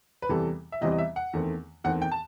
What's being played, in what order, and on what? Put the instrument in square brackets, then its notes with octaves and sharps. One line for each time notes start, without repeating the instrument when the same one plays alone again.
[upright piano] B4
E2 C3 E3 G3 C4 A4
E5
E2 C3 E3 G3 C4 D#5
D#5
E5
F#5
E2 D#3 A3 C4
E2 D#3 A3 C4 F#5
G5
A5